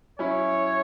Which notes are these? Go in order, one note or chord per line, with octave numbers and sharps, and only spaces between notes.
F#3 C#4 E4 C#5